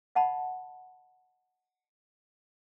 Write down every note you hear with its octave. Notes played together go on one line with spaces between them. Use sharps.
D#5 F#5 A5 B5